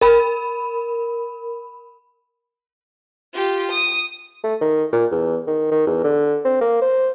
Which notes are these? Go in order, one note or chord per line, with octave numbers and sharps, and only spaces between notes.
A#4 B5
F4 G4
D#6
A3
D#3
A#2
E2
D#3
D#3
E2
D3
C4
A#3
C5